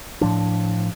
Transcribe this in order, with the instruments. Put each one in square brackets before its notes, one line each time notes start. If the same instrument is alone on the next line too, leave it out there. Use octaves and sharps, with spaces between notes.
[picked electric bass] A2 F3 D4